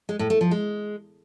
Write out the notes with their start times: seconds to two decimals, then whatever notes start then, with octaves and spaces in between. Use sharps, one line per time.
0.09 G#3
0.19 A2
0.30 A3
0.41 F3
0.51 G#3